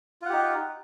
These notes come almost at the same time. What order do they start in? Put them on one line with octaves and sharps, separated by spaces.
F4 F#5 G4 D#4